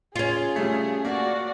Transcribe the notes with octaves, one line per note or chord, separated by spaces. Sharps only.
C#4 F4 G#4
C#3 G3 A3
A#3 F#4 D5